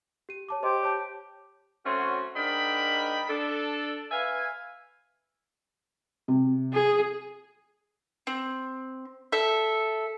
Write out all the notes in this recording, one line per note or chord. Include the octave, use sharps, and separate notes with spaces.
G4 D#7
C#5 A5 D6
G4 C5 D#5 C6
C#5 A5 G6
F#3 A3 C4 C#4 F#4
G#2 D4 A#4 D#5 G5 B5
D4 A4
B4 E5 F5 G#5
C3
G#4
C4
A4 E5